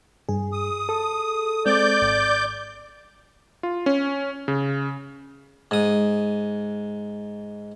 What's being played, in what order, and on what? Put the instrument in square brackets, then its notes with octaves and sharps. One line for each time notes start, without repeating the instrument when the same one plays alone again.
[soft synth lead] G2 [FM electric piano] G#4
[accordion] D#6
[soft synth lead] A4
[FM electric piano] G#3 C4 [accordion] D5 D6 G6
[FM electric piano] G#1
[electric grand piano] F4
C#4
C#3
[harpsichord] G#2 D#6